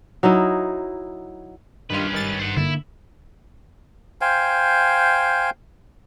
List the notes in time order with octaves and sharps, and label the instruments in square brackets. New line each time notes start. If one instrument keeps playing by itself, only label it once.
[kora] F#3 D#4 E4 D#5
[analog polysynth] G2 [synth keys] D#3 G3 F4 [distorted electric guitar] C#4 B4
[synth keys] G#1 D#3 A6
[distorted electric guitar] C5 F#5
[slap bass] D3 A#3 [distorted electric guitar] E4
[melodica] C5 F5 G5 G#5